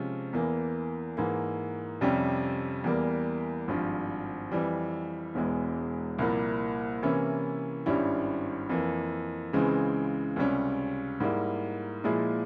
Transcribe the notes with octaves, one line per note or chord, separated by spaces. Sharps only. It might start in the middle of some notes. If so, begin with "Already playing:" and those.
Already playing: C3 F3 G#3 C#4
E2 E3 A#3
G#2 E3 A#3
F2 C3 G3 C#4 G4
E2 E3 G3 A#3
G#1 G2 F3
F2 E3 G3
E1 E2 E3 G#3
C2 A#2 F3 A#3 E4
C3 E3 A#3 C#4 E4
G#1 G2 G3 C#4 E4
F2 E3 A#3
C#2 C#3 E3 G#3 C4
C#2 C3 G3 C#4
G#2 G3 A#3 E4
A#2 F3 G#3 E4 G#4